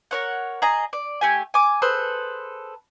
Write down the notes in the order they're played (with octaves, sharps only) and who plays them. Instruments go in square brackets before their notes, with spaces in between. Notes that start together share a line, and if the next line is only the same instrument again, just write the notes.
[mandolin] A#4 C#5 F#5
G#4 D#5 A#5
D5
A3 G4 G#5
G#5 D6
G#4 A4 B4 C5